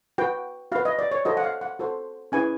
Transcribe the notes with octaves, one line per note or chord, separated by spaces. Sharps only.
F#4 B4 G5
F#4 B4 F5
D#5
D5
C#5
F#4 A4 C5 D#5
F#5
F5
F#5
F#4 A4 C5
C#4 E4 G#4 B4 G#5